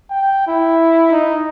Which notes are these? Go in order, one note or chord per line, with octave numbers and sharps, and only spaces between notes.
G5
E4
D#4